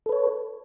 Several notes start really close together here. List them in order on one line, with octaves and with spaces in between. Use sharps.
A4 B4 C#5